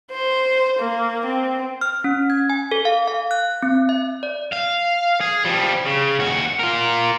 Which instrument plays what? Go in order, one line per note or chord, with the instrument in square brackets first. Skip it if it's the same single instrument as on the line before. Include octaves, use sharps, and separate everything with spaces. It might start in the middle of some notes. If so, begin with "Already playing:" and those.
[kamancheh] C5
A#3
C4
[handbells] F6
C#4
G#6
G#5
A4
F5
F5
F#6
C4
E5
D5
[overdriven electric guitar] F5
G#4
F3 G3
C#3
D#2 F#4
F4 A#4